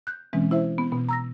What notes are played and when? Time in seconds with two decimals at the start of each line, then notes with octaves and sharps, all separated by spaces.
0.07 F#6 G6
0.33 B2 E3 G#3 C4 C#4
0.51 E4 C5 E5
0.78 B3
0.92 B2 B3
1.09 A#5 E6 A#6